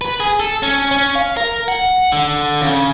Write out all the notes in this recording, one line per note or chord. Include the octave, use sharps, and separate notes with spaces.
B4
G#4
A4
C#4
C#4
F5
A#4
F#5
D3
C#3